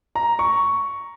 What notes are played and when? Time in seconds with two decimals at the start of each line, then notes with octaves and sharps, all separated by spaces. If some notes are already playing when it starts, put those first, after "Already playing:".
0.15 A#5
0.39 C#6